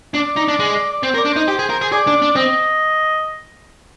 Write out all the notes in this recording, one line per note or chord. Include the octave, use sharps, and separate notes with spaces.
D4 D5
D#4
D4
G#3
D5
C4 C5
A#4
D5
D4
D#4 C5
G4
G#4
A#4
G#4
G#4 D5
D4
D4
C4 D#5